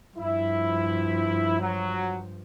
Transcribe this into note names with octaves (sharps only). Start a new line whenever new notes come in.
G2 F3 E4
F#3